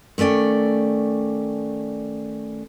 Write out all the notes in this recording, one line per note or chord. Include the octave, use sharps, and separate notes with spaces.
D#3 A3 C#4 D5 G5